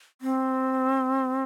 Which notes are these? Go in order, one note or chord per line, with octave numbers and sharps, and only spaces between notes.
C4